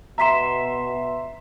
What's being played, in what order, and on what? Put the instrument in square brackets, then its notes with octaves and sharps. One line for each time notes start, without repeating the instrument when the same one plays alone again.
[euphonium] B2 [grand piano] E5 C6 [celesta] A#5 B6 E7